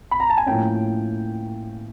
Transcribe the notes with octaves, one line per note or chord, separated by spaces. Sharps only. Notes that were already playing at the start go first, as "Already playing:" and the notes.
B5
A#5
A5
G#5
A2 F3 A#3 C#4 G5